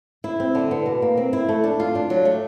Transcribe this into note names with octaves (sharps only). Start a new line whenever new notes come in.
E4
C4
D3
B3
B2
A#3
C4
E4
A3
D4
F4
D4
F#3
A3